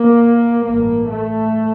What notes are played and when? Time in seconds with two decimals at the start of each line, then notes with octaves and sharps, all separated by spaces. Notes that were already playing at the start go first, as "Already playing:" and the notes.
Already playing: A#3
0.64 A1 G2 A#3
1.10 A3